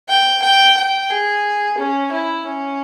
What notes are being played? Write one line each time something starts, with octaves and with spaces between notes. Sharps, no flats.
G5
G5
G5
G#4
C#4
E4
C#4